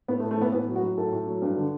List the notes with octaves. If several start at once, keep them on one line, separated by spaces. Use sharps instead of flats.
A2 B3
A3
A2
A3
E3 B3
A2 B3
F#3
F#4
F#3
A2 A4
A2
F#3
G2
D3